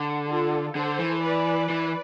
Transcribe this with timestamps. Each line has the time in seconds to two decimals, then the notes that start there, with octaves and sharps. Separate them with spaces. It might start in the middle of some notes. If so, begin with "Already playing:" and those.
Already playing: D3
0.27 F4 A4
0.75 D3 A4 C5
0.99 E3
1.22 B4 D5
1.70 E3